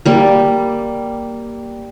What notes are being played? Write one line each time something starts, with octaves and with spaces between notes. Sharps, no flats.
G3 A#3